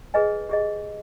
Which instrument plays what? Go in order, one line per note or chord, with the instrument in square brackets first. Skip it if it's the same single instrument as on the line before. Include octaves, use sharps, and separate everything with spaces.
[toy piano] G#4 B4 D#5 G#5
G4 G#4 D#5